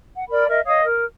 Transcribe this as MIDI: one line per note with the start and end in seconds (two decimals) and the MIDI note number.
0.13 0.23 78
0.29 0.46 70
0.29 0.46 74
0.29 0.46 83
0.48 0.59 70
0.48 0.59 75
0.48 0.59 76
0.65 0.82 73
0.65 0.82 75
0.65 0.82 77
0.65 0.82 87
0.83 1.03 70